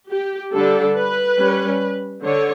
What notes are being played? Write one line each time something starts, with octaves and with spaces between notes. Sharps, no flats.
G4
D3 G3 D4 A4
B4
G3 C#4
D3 C#5